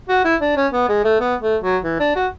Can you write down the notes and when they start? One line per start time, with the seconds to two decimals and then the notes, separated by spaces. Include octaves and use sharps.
0.09 F#4
0.25 E4
0.41 D4
0.56 C#4
0.73 B3
0.89 G#3
1.05 A3
1.20 B3
1.42 A3
1.63 F#3
1.84 E3
2.00 D4
2.16 F#4